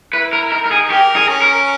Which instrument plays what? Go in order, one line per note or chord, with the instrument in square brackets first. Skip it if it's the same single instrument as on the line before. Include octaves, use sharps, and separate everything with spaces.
[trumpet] E4 [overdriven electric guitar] B4
[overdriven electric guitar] A#4
[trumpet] D#4 [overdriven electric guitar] A#4
[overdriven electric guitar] A#4
G#4
[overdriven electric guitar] G4 [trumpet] A#4
[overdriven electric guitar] G#4
[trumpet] C#4
[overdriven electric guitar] A#4